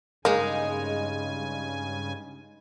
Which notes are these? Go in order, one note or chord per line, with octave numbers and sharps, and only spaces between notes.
G2 C#3 G#3 A#3 D#4 G#5